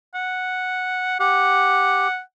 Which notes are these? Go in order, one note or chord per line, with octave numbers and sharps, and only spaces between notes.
F#5
G4 F#5